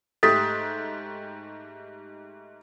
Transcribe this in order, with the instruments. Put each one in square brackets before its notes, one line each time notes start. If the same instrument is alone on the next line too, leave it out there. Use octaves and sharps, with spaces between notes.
[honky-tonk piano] G#2 A3 G4 [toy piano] A4 [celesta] A6 B6